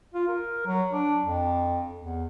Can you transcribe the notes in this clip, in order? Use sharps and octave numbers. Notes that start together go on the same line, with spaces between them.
F4
A#4
F#3
D4
F2
E2